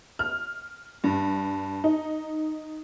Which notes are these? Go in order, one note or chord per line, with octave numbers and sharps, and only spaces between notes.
F6
G2
D#4